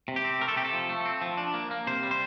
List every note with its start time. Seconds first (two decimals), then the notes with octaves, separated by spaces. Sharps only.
0.08 C3
0.16 G4
0.24 C4
0.41 A3 A#4
0.48 A4
0.56 C3 G4
0.65 A4
0.73 F3
0.89 A3
1.05 C4
1.21 F3
1.38 D4
1.54 A#3
1.71 A#3
1.87 C3 C5
2.03 G3
2.11 C5